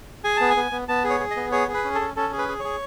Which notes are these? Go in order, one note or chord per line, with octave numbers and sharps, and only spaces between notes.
G#4 G#5
B3 A5
G#5
B3
B3
B3 A5
G#4
C#5
G#4
D#5
B3
G#4 C#5
G#4
B4
C#4
A4
C#4
C#4 A4
G#4
B4
G#4
G#4 C#5